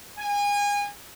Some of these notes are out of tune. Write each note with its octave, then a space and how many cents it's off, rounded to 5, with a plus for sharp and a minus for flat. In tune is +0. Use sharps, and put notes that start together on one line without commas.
G#5 -30